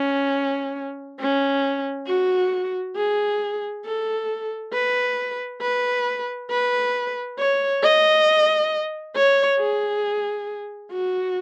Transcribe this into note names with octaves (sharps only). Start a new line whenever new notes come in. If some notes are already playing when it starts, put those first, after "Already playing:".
Already playing: C#4
C#4
F#4
G#4
A4
B4
B4
B4
C#5
D#5
C#5
G#4
F#4